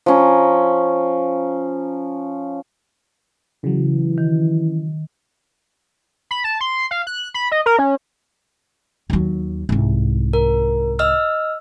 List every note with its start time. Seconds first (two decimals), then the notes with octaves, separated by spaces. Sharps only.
0.06 F3 C#4 A#5
3.64 C#3 E3 F#3
4.18 D#3
6.31 B5
6.44 A5
6.61 C6
6.91 F5
7.07 F#6
7.34 B5
7.52 D#5
7.66 A#4
7.79 C#4
9.10 D#2 F#3
9.69 C2 G#2
10.33 A#4
10.99 D#5 E6 F6